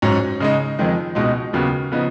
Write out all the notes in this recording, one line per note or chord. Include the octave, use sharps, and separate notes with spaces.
G#2 F#3 C#4
C#3 G#3 D#4
F2 D#3 G#3
C#2 B2 G#3 D#4
D#2 C#3 F#3 B3
C#3 F3 B3 D#4